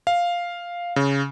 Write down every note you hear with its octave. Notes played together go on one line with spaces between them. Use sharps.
F5
C#3